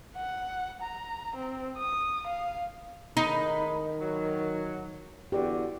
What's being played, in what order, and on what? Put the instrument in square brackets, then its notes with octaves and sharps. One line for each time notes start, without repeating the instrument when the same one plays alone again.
[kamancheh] F#5
A#5
C4
D#6
F5
[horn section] A2 G#3 B5 [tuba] D#3 [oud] D#4
[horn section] F#3
[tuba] E2 [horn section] D3 F#4 [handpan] G4 D5